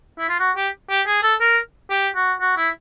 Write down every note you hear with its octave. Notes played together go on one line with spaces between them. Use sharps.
E4
F4
F#4
G4
G4
G#4
A4
A#4
G4
F#4
F#4
E4